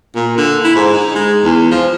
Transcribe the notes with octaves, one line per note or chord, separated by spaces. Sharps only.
A#2
D3
E4
G#2
D#4
G#3
E2
F3